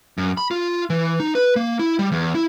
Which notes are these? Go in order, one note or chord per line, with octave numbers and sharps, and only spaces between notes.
F#2
B5
F4
E3
D#4
B4
A#3
E4
G3
E2
E4